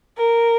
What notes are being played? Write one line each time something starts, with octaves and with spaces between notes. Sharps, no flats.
A#4